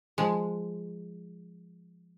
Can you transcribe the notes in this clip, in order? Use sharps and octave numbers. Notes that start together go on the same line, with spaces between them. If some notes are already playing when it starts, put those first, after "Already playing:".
F3 G#3